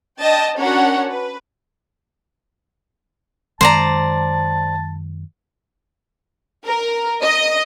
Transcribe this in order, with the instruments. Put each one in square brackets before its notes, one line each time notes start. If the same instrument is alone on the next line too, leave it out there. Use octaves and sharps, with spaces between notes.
[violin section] D4 D#5 G5 A5
C#4 D4 F#4 A#4 C#5 F#5
B4
[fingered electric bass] F#2 D#3 G#3 [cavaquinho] C5 D5 A#5 [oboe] A5
[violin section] A#4
D#5